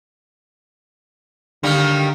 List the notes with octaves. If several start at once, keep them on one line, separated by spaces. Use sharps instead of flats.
D3 D#3 G3 A#3